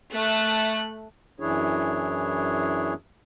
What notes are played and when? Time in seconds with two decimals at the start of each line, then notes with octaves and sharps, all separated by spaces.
0.13 A3 F#6
1.40 F#2 E3 D4 E4 G#4 C#5